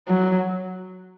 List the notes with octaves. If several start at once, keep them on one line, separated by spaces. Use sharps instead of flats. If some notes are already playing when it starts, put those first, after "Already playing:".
F#3